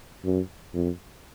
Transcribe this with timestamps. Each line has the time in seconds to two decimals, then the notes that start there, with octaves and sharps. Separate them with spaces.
0.25 F#2
0.74 F2